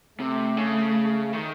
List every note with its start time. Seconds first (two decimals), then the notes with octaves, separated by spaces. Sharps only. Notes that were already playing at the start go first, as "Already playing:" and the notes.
0.19 C3 A3
0.57 C#3
1.33 D#3